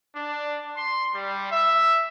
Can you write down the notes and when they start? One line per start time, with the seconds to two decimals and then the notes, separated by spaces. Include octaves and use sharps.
0.15 D4
0.77 C6
1.14 G3
1.52 E5